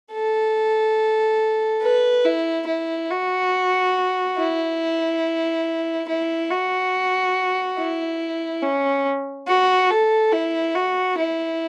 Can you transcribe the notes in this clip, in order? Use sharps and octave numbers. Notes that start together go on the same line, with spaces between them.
A4
B4
E4
E4
F#4
E4
E4
F#4
E4
C#4
F#4
A4
E4
F#4
E4